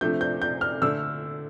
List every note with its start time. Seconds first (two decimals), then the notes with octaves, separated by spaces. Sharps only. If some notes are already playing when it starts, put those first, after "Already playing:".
0.01 C3 F3 A3 D4 G6
0.21 G6
0.42 G6
0.61 F6
0.82 D3 A3 D4 E6